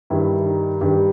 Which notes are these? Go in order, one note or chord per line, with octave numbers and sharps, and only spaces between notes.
G2 D#3 G3 E4
D#4
G2 D#3 G3 G4